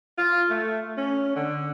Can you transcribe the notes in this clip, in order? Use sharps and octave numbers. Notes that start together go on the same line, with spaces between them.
F4
A3
C#4
D3